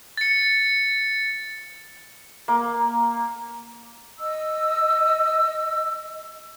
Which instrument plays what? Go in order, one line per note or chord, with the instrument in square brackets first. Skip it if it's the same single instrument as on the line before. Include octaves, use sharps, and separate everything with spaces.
[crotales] A6 C#7
[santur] A#3
[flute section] D#5 E6